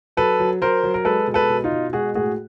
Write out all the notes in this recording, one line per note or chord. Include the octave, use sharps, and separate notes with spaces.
F#3 A4 B4
F#3
F#3 A#4 C5
F#3
A#4
G#3 A4 B4
B2
A4 B4
B2
D#4 F4
B2
G#3 F#4 G#4
A2 F#4 G#4